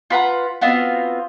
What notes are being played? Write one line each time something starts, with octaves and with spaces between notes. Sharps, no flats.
F4 B4 F#5 A#5
B3 C4 F4 F#4